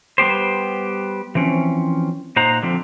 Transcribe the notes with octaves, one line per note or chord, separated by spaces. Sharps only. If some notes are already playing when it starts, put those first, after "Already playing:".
G3 B3 G4 C5
E3 F3 C4 C#4
A#2 D#4 C5 F#5 A#5
D3 F3 C4